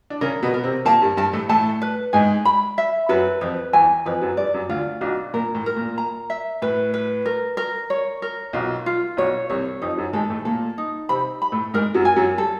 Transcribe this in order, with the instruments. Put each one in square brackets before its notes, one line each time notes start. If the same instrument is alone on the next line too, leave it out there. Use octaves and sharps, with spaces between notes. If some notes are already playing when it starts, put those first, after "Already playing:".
[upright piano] D4
[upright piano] C#3 C#4 [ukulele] A#4
[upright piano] B2 B3
[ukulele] A#4
[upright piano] C3 C4
[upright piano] A#2 A#3 [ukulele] A5
[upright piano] G2 G3
[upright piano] G2 G3 [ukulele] A5
[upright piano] A2 A3
[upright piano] A2 A3 [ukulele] A5
[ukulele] B4
[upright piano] G#2 G#3 [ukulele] G#5
[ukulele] B5
E5
[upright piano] F#2 F#3 [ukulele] B4
[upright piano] F2 F3 [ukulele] B4
[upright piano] E2 E3 [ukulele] G#5
[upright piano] F2 F3 [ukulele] B4
[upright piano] F#2 F#3
[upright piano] G2 G3 [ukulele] D5
[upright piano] F#2 F#3
[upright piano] D2 D3 [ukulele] F4
[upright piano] B1 B2 [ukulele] D4
[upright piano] A#2 [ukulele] A#4
[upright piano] A2
[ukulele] A#4
[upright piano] A#2
[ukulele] A#5
E5
[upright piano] A2 [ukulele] B4
[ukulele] B4
A#4
A#4
C#5
A#4
[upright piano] B1 B2 [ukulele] F4
[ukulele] F4
[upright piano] B1 B2 [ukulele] C#5
[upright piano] C2 C3 [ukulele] C#5
[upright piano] F2 F3 [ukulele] D#4
[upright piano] F#2 F#3
[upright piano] G#2 G#3 [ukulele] A4
[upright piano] A2 A3
[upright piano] A#2 A#3 [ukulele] A4
[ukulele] D#4
[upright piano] C3 C4 [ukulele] B5
[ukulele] B5
[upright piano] A2 A3
[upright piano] G#2 G#3 [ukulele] A#4
[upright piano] F#2 F#3
[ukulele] G#5
[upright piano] F#2 F#3
[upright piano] G3 [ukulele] A4